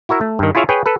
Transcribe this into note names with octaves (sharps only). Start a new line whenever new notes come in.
E4 F#4 A#4 E5
A3
G2 D#3
E4 F4 G#4 C#5 E5 F5
G#4 B4 C#5 G5
A4 B4